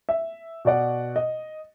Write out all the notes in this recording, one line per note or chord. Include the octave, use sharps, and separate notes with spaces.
E5
B2 F#4 D5 F#5
D#5